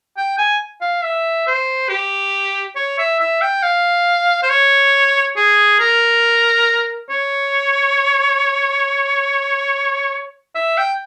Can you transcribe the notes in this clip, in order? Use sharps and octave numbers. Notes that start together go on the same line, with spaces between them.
G5
G#5
F5
E5
C5
G4
C#5
E5
E5
G5
F5
C5
C#5
G#4
A#4
C#5
E5
G5